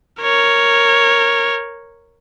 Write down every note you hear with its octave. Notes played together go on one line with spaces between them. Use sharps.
A#4 C#5